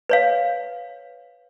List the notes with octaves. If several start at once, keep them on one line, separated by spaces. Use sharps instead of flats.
B4 C#5 F5